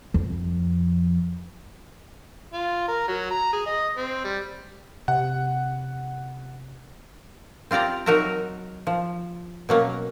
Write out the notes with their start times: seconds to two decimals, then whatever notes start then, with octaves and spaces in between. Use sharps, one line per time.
0.14 F2
2.53 F4
2.88 A#4
3.08 F#3
3.31 A#5
3.53 G#4
3.66 D#5
3.97 C4
4.24 G3
5.08 C3 F#5
7.71 C4 F4 G4 D5 A#5
8.06 F#3 D#4 F#4 A#4 E5 A#5
8.87 F3
9.69 B2 F#3 A#3 C#4